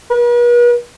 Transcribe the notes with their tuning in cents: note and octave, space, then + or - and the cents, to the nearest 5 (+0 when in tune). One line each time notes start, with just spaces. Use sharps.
B4 -45